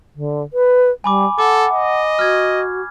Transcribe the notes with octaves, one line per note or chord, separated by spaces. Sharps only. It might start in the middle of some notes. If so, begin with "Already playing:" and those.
D3
B4
G3 G#5 B5 D6
A4 F#5 D6
D#5
F#4 F6 G#6